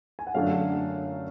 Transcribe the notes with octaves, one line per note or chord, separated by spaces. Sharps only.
G#5
F#5
F#2 D3 F#3 A3 D4 F5